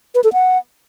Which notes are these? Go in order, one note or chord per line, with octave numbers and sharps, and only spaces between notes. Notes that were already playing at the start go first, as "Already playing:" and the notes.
B4
A4
F#5